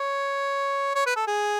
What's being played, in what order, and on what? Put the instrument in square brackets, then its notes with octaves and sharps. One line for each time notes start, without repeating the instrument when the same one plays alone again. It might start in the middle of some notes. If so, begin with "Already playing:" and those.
Already playing: [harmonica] C#5
C#5
B4
A4
G#4